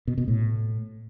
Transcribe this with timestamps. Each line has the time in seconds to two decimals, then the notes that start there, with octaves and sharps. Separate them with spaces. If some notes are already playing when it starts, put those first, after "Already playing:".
0.07 B2
0.18 B2
0.28 A2